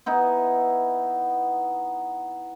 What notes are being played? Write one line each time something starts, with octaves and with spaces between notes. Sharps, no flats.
B3 D#4 E4